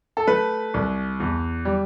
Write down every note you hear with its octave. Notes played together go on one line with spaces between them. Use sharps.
A4
A3 B4
C2
E2
G3